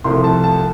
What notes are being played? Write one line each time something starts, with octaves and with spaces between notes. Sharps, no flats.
C2 C3 F3 A3 C6
A5
A5